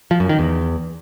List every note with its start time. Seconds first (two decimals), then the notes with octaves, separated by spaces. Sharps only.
0.11 F3
0.20 F#2
0.29 D#3
0.39 E2